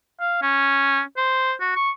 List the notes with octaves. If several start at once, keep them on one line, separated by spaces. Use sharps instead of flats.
F5
C#4
C5
F#4
C#6